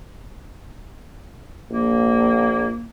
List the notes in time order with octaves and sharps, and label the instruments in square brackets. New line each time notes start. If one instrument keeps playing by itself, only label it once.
[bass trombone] A#1 [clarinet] A#3